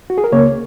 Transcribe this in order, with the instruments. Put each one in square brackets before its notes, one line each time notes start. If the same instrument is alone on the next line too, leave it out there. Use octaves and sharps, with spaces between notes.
[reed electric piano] F#4
G#4
A#4
C#2 C#3 A#3 C#5